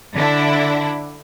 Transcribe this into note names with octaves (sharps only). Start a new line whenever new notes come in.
D3 D4 E4